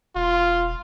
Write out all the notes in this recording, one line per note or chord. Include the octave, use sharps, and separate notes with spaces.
E1 F4